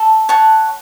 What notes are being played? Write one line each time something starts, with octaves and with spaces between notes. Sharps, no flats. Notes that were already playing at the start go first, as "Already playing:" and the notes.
Already playing: A4
C#5 F#5 A5